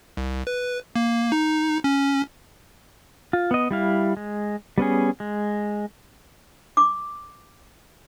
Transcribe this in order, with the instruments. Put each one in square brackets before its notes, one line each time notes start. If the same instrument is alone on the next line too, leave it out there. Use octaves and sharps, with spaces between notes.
[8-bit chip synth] C2
B4
A#3
D#4
C#4
[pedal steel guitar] F4
B3 D#5
G3 E4 F5
G#3
G3 B3 C#4 G#4
G#3
[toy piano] D6